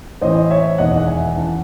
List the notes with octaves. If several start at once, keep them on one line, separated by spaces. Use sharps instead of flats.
A1 A2 E3 C5 D#5
C#5 E5
E1 E2 D#3 D#5 F#5
F#5
E5 G#5
F#2 E3 F#5 A5